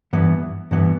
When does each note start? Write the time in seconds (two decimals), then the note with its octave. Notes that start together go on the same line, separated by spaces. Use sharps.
0.13 G2 E3 B3
0.71 G2 E3 B3